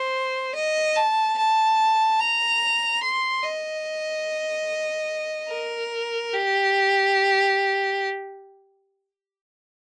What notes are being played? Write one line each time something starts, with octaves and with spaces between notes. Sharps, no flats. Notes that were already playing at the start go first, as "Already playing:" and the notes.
Already playing: C5
D#5
A5
A5
A#5
C6
D#5
A#4
G4